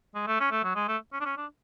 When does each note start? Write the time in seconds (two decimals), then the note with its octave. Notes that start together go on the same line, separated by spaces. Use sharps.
0.15 G#3
0.27 A3
0.40 C#4
0.51 A3
0.64 F#3
0.75 G#3
0.88 A3
1.13 C#4
1.21 D4
1.25 C#4
1.37 D4